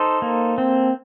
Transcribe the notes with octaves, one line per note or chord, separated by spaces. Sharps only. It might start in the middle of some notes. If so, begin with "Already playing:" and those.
Already playing: D#4 A4 C5
A#3
C4